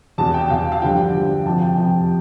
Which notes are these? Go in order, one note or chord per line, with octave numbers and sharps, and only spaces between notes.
E2 B2 A5
G5
E2 B2 F5
F5
G2 D3 F3 G5
G2 D3 F3
F2 C3 F3 A5
G5
F2 C3 F3 G5